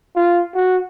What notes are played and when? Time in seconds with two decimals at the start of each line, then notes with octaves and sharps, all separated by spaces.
0.16 F4
0.55 F#4